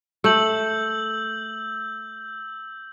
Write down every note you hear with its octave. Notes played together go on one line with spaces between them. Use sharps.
A3 E6 G6 F#7